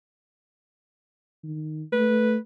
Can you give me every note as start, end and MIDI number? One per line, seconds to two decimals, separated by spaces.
1.44 1.83 51
1.93 2.37 57
1.93 2.36 71